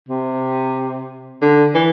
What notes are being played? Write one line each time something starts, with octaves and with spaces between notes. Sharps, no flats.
C3
D3
E3